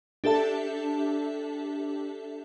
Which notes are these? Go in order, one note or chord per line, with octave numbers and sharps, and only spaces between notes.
D4 G4 A4 E5 A5